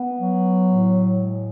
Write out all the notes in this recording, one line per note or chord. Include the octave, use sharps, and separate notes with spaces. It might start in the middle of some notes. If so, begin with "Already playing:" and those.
Already playing: B3
F#3
A2
G#3